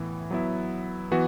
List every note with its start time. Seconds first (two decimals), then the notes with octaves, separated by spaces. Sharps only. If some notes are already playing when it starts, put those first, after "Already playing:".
Already playing: A2 E3 B3
0.31 F#3 B3 E4
1.11 E3 B3 F#4